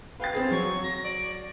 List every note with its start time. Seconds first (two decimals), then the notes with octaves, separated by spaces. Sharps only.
0.20 B4 F5 G5 A6
0.34 C4 G#4
0.51 F#3 C#6
0.84 A#6
1.03 D5